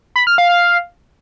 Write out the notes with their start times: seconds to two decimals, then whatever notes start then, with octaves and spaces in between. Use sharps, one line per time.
0.16 B5
0.27 F6
0.38 F5
0.49 F5